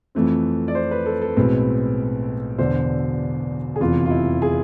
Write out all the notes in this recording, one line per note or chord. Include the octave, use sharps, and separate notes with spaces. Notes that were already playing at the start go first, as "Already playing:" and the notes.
F2 E3 A3 C4
D5
C5
B4
A4
A4
B1 A2 G#3 C4 B4
E1 E2 D3 C5
G#4
F1 E2 C3 E3 F4
F4
E4
G#4